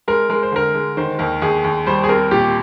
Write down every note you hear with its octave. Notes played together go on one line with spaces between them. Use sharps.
G#3 A#4
G#3 A#4
C5
D3 A#4
G#3
D#3 C5
D#2 A#4
D#2 G#4
D#2
G3 C5
G#4
C4 A#4
A#2 G4